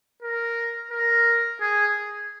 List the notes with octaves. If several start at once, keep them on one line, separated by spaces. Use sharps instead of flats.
A#4
A#4
G#4